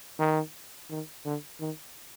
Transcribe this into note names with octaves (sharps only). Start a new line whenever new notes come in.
D#3
D#3
D3
D#3